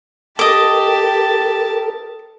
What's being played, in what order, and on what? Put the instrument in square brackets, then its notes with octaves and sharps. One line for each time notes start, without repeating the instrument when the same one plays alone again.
[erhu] G4 [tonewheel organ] A4 A#4 [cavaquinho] D#5 D6 [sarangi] A5